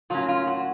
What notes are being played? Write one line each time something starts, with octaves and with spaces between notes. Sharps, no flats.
A2 F#3 A#3 C#4 F4
F4
F#4